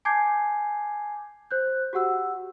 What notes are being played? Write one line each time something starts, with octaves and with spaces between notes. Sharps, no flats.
G#5 A5 D6 G6 G#6 C7
C5 F#6 G6
F#4 G4 F#5 E6